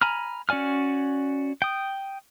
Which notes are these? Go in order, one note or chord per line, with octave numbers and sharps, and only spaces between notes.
G#5 A#5 B5 F6
C#4 F#4 D5 G#5 F6
G5 D#6